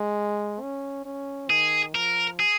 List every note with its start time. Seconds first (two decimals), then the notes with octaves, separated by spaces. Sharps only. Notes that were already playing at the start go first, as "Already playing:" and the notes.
Already playing: G#3
0.61 C#4
1.05 C#4
1.50 D#3 G#4
1.95 F3 A#4
2.40 G#4